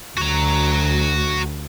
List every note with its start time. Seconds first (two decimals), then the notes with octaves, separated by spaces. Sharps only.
0.18 D2 F#4 A#5